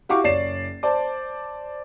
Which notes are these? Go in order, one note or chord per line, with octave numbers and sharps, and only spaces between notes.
E4 F#4 G4 F5 C#6 D6
F#1 C#5 D5 A6 C7 E7
C5 D5 A5 D6